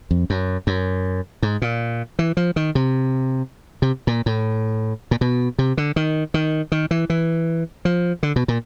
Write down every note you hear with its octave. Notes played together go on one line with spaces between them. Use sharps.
F2
F#2
F#2
G#2
A#2
E3
F3
D#3
C3
C3
A#2
A2
A#2
B2
C3
D3
D#3
D#3
D#3
E3
E3
F3
D3
B2
A#2